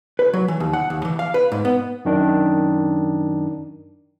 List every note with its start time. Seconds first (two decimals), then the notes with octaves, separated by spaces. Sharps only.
0.19 B4
0.33 F#3
0.48 E3
0.60 D#2
0.73 F#5
0.90 D#2
1.05 E3
1.19 F5
1.34 B4
1.52 G#2
1.65 B3
2.05 F#2 D#3 D4